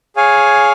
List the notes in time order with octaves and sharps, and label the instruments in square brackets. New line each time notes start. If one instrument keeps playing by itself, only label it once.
[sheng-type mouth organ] G#4 C#5 F5 G#5